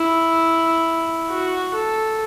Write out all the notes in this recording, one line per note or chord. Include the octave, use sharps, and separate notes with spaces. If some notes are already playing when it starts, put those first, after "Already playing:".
Already playing: E4
F#4
A4